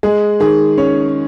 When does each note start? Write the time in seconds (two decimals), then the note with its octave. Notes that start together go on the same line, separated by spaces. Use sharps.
0.03 G#3 G#4
0.40 D#3 G#4
0.78 C#4 C#5